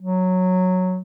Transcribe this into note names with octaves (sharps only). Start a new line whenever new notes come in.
F#3